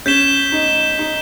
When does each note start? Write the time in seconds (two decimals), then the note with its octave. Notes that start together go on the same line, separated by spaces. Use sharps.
0.06 C#4 G6 B6 E7 G7
0.52 D#4
0.99 D#4